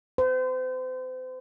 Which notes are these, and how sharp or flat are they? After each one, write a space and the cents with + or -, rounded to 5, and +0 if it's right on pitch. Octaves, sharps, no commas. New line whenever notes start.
C5 -35